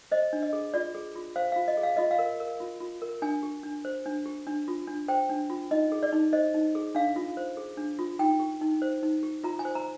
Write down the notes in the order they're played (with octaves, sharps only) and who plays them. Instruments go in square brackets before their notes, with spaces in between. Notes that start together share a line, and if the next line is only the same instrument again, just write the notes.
[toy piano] C5 D#5
D4
D#5
G#4
F4 D5
G#4
F4
C5 F5
F4 F5
D#5
G#4
F5
F4 D#5
F5
A#4
A#4
F4
F4
A#4
D4 G#5
G4
D4
C5
D4
G4
D4
F4
D4
C5 G5
D4
F4
D#4 D#5
G#4
D5
D#4
C5 D#5
D#4
G#4
D4 F5
F4
C5
G#4
D4
F4
D#4 G5
G4
D#4
C5
D#4
G4
F4 A#5
G#5
C5
A#5